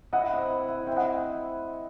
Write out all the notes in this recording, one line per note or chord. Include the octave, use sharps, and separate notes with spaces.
E4 D#5 F#5
C3
E4
E4
C4 E5 G5
D#5 F#5